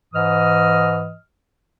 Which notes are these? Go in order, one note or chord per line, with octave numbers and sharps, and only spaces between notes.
G#2 E3 D#5 D#6 F6